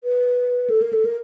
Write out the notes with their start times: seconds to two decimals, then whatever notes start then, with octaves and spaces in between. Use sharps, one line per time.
0.04 B4
0.70 A4
0.82 A#4
0.93 A4
1.05 A#4